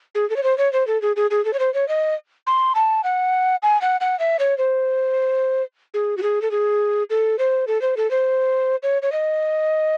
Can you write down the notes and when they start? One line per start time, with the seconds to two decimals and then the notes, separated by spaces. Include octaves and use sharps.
0.15 G#4
0.30 A4
0.36 C#5
0.43 C5
0.58 C#5
0.73 C5
0.87 A4
1.02 G#4
1.16 G#4
1.31 G#4
1.45 A4
1.53 C#5
1.59 C5
1.74 C#5
1.88 D#5
2.47 C6
2.75 A5
3.04 F#5
3.63 G#5
3.82 F#5
4.01 F#5
4.19 E5
4.39 C#5
4.58 C5
5.94 G#4
6.17 F#4
6.23 G#4
6.42 A4
6.51 G#4
7.10 A4
7.39 C5
7.67 A4
7.82 C5
7.97 A4
8.11 C5
8.83 C#5
9.02 C#5
9.12 D#5